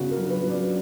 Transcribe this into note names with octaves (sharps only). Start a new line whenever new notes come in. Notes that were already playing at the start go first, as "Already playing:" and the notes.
Already playing: C#3 B3 D4 F#4
A#4
F#3
B4
F#3
D5